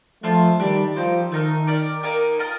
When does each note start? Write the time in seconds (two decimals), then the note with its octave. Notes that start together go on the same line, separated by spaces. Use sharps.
0.23 F3 A3 D4 F4 A4 C5
0.59 D#3 G3 D4 G4 D5
0.96 F3 C4 D#4 G4 C5
1.31 D#3 A3 D#4 A#4
1.67 G4 A#4 D5
2.03 A#3 D#4 G4 A#4
2.39 F4 A#4 D#5